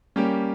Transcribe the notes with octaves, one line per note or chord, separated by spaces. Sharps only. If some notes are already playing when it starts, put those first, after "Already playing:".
G3 A#3 C#4 G4